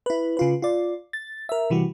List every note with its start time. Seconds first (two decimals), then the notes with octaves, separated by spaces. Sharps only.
0.06 E4 B4
0.37 C#3 F4 B4
0.62 F4 D5
1.13 A6
1.49 A#4 E5
1.70 C3 E3 G3 F#4